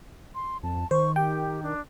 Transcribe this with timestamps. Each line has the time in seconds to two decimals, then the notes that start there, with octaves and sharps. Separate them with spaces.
0.35 C6
0.63 F2 A5
0.91 D#3 C5 C#6
1.16 G4 G5
1.63 D4